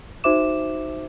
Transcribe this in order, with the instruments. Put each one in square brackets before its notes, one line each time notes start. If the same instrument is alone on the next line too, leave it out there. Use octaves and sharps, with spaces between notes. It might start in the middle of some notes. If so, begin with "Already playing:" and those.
[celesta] D#4 F#4 C5 E5 D6 E7